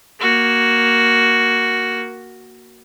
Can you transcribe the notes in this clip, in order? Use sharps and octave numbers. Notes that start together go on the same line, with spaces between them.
A#3 F#4